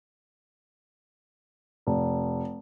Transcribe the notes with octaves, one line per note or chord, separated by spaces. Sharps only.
F1